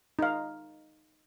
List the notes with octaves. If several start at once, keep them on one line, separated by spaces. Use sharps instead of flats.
D#4 F5